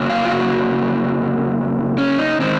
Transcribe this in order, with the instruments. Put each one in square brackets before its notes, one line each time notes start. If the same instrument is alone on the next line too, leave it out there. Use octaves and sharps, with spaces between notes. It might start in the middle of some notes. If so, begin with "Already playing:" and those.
Already playing: [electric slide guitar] F2 C#3 F#3 A#3
F5
F4
F#4
C#4
D#4
D#3 G#3 C4